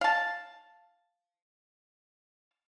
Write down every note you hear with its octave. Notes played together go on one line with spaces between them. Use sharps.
F5 A5